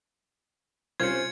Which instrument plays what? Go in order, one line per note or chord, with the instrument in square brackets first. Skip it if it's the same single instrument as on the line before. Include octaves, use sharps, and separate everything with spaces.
[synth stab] C2 C#4 C5 [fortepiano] F4 [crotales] G#6 C#7